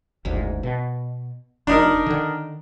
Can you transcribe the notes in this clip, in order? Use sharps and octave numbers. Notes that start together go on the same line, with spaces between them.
F#1 D2 G#2
B2
F1 D4 D#4 A#4
D3 D#3